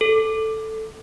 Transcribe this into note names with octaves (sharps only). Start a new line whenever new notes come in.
A4